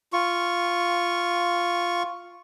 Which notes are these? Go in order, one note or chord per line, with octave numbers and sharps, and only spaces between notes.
F4 C#6